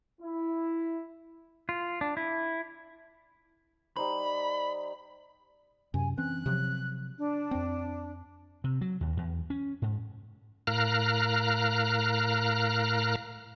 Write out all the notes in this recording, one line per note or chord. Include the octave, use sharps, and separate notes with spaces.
E4
F4
D4
E4
G3 D#4 C5 B5
F#2 C3 G#5
E3 C4 C#4 F#6
C3 F3 F#3
D4
F2 C4
C3
F#3
D#2
E2
C#4
G#2
A2 A#4 F5 A#5 F6 F#6